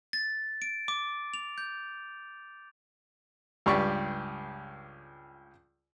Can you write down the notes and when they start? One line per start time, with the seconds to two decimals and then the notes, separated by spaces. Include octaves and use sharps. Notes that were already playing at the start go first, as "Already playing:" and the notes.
0.13 A6
0.62 D7
0.88 D6
1.34 F7
1.58 G6
3.66 C#2 G2 G4 D5 C#6